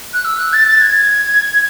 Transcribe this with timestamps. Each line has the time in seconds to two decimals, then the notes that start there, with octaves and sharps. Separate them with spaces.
0.14 F#6
0.25 E6
0.39 F#6
0.53 A6
0.67 A6
0.81 G#6